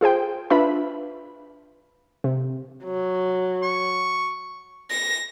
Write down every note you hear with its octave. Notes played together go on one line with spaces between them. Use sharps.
F4 G#4 C5 G5
D4 F4 B4 E5 B5
C3
F#3
C#6
A#6